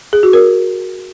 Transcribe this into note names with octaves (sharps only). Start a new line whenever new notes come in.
G#4
F#4
A#4